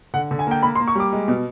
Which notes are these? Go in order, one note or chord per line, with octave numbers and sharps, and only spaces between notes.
D3 F#5
D3
G#5
A#3 G5
A#3 B5
C6
A#3
C#6
G3 D6
G#3
B2